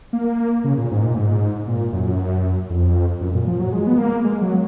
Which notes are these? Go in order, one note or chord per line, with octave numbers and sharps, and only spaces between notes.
A#3
C#3
A#2
G#2
A#2
G#2
A#2
F#2
F2
F#2
A#2
F3
F#3
G#3
B3
A#3
G#3
F#3